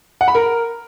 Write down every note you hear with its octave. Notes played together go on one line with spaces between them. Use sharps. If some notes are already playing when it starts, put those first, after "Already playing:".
F#5
B5
A#4